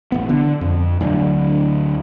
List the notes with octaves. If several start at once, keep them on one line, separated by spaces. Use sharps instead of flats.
A1 B3
D3
F2
D2 D3 F#3